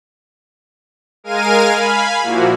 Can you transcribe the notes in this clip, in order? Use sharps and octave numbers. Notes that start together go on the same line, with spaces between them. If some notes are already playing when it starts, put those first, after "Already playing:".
G#3 A#4 F5 G#5 F6 D#7
F5 G#5 B5
A#2 F3 A#3 E4 F#4